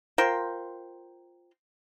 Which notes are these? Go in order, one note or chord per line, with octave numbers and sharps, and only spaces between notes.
F4 A#4 C5 G5